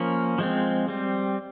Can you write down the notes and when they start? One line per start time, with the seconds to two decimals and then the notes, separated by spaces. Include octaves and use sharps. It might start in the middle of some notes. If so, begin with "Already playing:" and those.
Already playing: F3 A#3 C#4
0.38 F3 G#3 C4
0.88 G3 C4